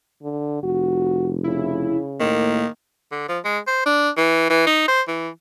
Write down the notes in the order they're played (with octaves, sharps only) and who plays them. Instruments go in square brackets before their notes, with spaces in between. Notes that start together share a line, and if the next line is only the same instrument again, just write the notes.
[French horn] D3
[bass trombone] F1 [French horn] F#4
[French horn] C#3 [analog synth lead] E4
[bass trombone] A2 [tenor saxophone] D#3 [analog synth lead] A#3
[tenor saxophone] D3
F3
G#3
C5
D4
E3
E3
D#4
C5
E3